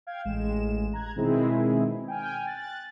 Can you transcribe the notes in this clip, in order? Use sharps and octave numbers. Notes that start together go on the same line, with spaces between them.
F5 G5 G#6
A1 G#3 E7
A#5 F#6 G#6
B2 D#3 G#3 C4 E4 G#4
G5 G#5 F6
F#6 A6